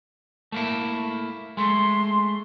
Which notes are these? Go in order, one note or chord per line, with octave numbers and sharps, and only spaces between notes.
A3 A#3 E4
G#3 A3 C6